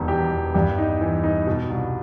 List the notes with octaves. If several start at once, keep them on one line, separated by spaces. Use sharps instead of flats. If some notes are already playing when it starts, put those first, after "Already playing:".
Already playing: E1 D#3 G3
E2 G4
E2
G2 G4
D#4
E3
D#4
B2
C2